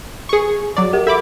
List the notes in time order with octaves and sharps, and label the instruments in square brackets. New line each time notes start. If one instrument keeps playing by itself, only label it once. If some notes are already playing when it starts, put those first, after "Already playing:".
[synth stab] G#4 C#6
F#3 D5
[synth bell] G4 A#4 F#5
[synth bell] A4 [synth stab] E5 B5 D6